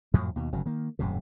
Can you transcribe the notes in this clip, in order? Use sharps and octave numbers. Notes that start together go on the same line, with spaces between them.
F2 A2 F3 F#3
D#2 B2
G1 C#3 F#3
D#3 A#3
D#1 F#2 A2 C3